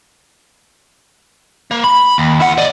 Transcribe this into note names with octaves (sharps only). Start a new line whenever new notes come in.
A#3
B5
D#2
E4 F#5
D5 D#5